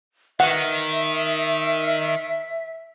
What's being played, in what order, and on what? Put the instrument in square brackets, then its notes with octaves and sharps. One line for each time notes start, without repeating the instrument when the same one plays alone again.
[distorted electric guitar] D#3 [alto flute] E5 [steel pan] F#5